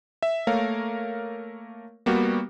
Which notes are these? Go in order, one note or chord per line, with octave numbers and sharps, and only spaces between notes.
E5
A3 A#3 A#4 C#5 F5
G3 A#3 B3 F#4 G4